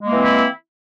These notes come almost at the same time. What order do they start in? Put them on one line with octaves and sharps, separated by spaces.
G#3 A#3 E3 C4 E4